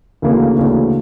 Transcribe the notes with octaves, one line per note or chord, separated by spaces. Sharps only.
D2 C#3 E3 A#3 C#4
D2 C#3 E3 A#3 C#4